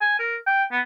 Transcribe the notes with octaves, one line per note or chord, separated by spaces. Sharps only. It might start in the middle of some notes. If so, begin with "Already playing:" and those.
G#5
A#4
G5
B3